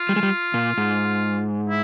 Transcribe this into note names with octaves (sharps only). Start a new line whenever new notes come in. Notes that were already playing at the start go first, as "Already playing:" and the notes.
Already playing: F4
G3
G#3
G3
A#2
G#2
E4